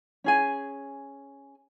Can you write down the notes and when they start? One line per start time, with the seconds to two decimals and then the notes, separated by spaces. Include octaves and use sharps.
0.24 C#4 G#4 G#5